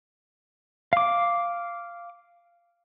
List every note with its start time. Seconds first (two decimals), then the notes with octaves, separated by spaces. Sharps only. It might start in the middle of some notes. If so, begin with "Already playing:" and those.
0.93 F5 D6